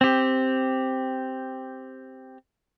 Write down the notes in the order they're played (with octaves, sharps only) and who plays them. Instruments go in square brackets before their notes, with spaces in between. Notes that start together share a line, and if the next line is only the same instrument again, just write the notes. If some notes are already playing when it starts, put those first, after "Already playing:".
[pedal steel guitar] C4 G4